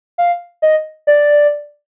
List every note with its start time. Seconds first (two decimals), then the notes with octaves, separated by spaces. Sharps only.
0.18 F5
0.62 D#5
1.07 D5